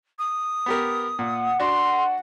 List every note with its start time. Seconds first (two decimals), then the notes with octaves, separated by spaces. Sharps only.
0.19 D#6
0.66 B3 G4 A#4
1.19 A#2 F#5
1.60 D4 F#4 C6